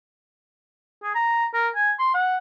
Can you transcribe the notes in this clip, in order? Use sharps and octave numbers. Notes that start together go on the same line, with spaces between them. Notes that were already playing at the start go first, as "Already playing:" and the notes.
G#4
A#5
A#4
G#5
C6
F#5